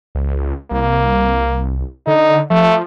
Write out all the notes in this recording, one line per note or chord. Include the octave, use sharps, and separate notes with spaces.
C#2
C2 A#3
D3 D#4
F3 A3